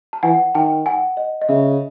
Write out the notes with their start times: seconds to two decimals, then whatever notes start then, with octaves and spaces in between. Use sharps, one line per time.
0.13 A5
0.23 E3 F#5 G#5
0.55 D#3 G5 A5
0.86 F#5 G#5
1.17 D#5
1.41 D#5
1.49 C#3 E5